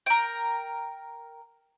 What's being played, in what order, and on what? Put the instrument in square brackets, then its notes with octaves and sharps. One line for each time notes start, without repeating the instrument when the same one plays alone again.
[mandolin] A#4 G5